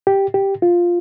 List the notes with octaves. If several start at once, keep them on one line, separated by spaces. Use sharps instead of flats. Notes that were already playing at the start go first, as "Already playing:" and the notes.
G4
G4
F4